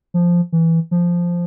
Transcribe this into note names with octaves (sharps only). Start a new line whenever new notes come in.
F3
E3
F3